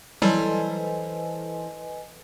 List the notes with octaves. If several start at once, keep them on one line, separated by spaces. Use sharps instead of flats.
E3 F#3 G3 A4 B4 C5 D#5 G#5